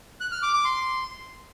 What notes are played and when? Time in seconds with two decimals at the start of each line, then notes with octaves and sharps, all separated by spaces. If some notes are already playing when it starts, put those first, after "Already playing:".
0.21 F#6
0.32 F6
0.43 D6
0.54 D6
0.65 C6